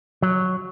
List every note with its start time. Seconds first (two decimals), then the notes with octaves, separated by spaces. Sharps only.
0.22 F#3